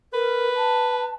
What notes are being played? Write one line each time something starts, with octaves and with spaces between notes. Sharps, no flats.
A#4 B4
A5